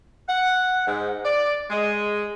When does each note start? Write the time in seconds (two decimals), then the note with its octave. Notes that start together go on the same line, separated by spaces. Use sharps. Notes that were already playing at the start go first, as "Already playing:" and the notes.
0.29 F#5
0.87 G#2
1.25 D5
1.70 G#3